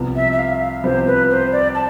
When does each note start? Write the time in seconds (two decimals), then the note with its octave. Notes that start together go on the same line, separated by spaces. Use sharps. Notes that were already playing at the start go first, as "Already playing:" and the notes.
Already playing: C2 C3 F3 B3
0.16 E5
0.33 E5
0.39 F5
0.61 F5
0.83 C2 C3 F3 B3 C5
1.07 B4
1.30 C5
1.52 D5
1.75 A5